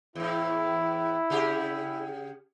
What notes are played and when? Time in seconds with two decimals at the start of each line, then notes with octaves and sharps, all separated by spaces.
0.15 E2 A2 E4
1.30 C#3 G4 G#4